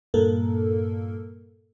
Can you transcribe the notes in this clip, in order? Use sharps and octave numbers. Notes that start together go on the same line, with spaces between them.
G2 A#2 A#3 A4 A#4